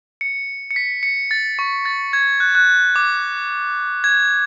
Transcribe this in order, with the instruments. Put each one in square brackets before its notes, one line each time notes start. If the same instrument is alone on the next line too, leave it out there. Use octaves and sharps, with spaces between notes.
[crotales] C#7
C#7
B6
C#7
A6
C#6
A6
G#6
F#6
G#6
F#6
D6
G#6